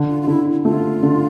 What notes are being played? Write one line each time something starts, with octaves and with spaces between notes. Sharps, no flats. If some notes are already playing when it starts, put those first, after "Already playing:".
Already playing: D3
F4
F4
D3 E4
A3 F4
D3